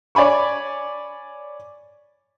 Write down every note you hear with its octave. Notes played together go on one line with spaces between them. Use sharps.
C#5 D5 G#5 B5 C#6